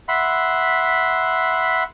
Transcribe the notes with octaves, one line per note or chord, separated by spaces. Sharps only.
E5 F#5 B5 C6